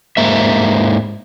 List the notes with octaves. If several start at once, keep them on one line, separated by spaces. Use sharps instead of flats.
G#2 A#3 E5